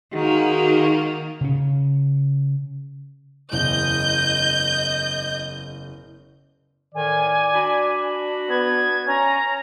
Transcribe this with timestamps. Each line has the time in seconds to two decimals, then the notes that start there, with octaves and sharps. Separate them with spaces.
0.13 D#3 G#3 A#3 D#4 F#4
1.41 C#3 C#4
3.52 F#1 E2 D#5 G6
6.95 A2 D#3 D5 G#5
7.55 D4 F#4 B5
8.49 B3 G#6
9.07 C#4 A#5